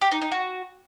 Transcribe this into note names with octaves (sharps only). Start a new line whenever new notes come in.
G4
D#4
D#4
F#4